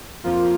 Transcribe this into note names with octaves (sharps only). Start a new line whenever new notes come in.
F2 F3 A#3 F4